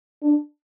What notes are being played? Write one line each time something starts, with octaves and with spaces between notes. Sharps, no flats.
D4